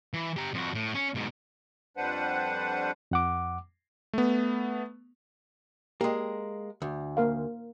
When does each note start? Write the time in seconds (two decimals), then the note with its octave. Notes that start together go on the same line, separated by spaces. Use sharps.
0.14 E3
0.37 G4 A#5
0.54 F2 F#4
0.75 A2
0.95 C#4
1.15 G#2 B2
1.97 F2 G3 D4 B4 C5 F#5
3.11 F2 F#5 D6
4.13 A3 B3
6.01 G#3 A#3 G4
6.82 D2
7.17 A#3 A#4 F5